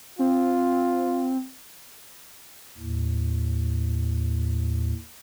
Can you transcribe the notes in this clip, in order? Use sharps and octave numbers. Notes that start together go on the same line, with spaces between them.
C4 F4
D#2 A2